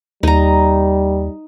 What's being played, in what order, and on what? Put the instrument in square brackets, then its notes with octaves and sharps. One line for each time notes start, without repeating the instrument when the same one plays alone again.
[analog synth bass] D#2 [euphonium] G3 [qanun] D#4 A#5